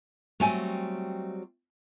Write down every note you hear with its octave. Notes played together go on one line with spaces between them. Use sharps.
F#3 G3 A3 C4 G5 G#5